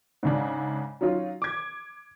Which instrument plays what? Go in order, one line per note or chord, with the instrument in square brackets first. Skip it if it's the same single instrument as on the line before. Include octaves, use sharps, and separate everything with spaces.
[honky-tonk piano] G#2 C#3 D4
F#3 C#4 D#4 F4
D6 G#6